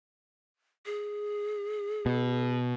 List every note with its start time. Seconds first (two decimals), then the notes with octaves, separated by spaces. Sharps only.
0.86 G#4
2.06 B2